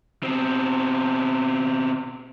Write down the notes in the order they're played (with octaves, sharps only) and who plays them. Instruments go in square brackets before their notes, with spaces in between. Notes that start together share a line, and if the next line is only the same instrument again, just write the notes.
[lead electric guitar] B2 C4